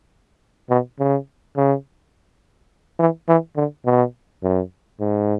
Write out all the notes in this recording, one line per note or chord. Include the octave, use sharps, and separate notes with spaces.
B2
C#3
C#3
E3
E3
D3
B2
F#2
G#2